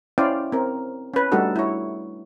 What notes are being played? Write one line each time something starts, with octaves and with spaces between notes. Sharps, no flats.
C#4 E4 C5 D5 F5 G5
C4 A#4
C#4 B4
G3 A3 D4 D#4 F#4 A4
E4 C#5